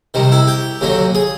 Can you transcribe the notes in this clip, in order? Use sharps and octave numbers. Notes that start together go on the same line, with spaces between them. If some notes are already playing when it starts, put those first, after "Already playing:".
C2 C3 D#3
E4
G4
D#2 D3 F#3
G#4